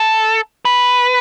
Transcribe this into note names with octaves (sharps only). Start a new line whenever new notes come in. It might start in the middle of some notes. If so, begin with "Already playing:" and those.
Already playing: A4
B4